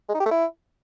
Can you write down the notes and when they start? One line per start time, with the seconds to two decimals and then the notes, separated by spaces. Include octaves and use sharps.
0.09 G#3
0.15 D#4
0.20 G4
0.26 A3
0.31 E4